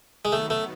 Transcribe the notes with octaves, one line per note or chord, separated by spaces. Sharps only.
G#3
D#3 F#3 A3 B3
A3